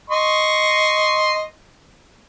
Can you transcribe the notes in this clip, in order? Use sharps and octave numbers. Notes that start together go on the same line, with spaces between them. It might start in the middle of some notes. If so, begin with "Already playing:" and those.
D#5 C6 C#6